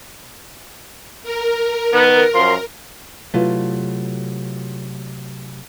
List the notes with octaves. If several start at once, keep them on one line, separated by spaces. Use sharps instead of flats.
A#4
D#3 B3
F#2 F3 C6
C3 F#3 A3 E4 F4 B4